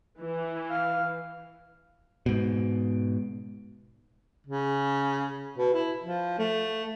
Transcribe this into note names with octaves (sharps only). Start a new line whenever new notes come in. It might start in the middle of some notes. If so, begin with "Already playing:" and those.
E3
F5
G#2 B2
C#3
B2
E4
F3
A3